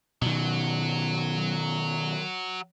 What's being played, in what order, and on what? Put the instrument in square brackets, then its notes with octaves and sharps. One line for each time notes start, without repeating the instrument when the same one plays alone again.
[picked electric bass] B2 D#3 [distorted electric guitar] F#3